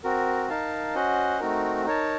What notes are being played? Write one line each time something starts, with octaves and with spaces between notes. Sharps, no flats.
C4 F#4 A#4
D#4 A#4 F5 A5
C#4 F#4 C5 D#5 F#5
A3 C4 D#4 F#4 A#4
D#4 A#4 C#5 A5